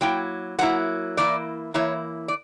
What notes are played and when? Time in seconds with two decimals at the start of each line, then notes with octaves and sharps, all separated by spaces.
0.01 F#3 A#3 E4 G5
0.59 F#3 A#3 E4 F#5
1.17 E3 A#3 E4 D5
1.74 E3 A#3 E4 C#5
2.28 D5